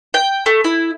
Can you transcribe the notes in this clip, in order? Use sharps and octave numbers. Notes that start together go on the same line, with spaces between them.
G5
A3
E4